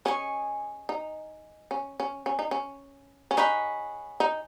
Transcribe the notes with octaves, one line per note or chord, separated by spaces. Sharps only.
C#4 G#4 D#5 G#5 C#6
D#4
C#4
C#4
C#4
D#4
C#4
C#4
D#4 G#4 C#5 F#5 B5
D#4